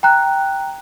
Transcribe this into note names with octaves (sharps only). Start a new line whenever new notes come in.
G5 A#5 F#6